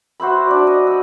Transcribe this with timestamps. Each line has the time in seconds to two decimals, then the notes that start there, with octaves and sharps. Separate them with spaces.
0.20 F#4 C5 E5 B5
0.47 D4 D5
0.67 D#5
0.87 D5 E6